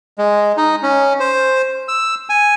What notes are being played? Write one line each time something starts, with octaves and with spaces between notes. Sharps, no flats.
G#3
D#4
C#4
C5
E6
G#5